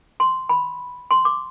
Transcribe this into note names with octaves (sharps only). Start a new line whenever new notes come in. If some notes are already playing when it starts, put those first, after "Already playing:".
C6
B5
C6
D6